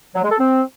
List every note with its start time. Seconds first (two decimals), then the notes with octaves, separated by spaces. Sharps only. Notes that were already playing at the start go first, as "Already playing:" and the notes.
0.15 F#3
0.23 G#3
0.31 A4
0.38 C4